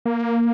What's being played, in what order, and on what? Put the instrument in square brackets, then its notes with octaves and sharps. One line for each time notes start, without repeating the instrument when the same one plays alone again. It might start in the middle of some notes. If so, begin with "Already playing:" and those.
[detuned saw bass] A#3